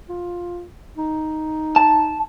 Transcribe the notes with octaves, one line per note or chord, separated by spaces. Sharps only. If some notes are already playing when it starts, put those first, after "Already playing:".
F4
D#4
A5